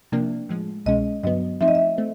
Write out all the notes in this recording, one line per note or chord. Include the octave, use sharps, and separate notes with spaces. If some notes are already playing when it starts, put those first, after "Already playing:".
C3 F3 A#3 D4
A2 F3 G#3
C2 B2 G#3 C#4 D#5
G2 D3 F#3 B3 D#5
F3 A3 C4 D#4 E5
D#5
E5
A3 C4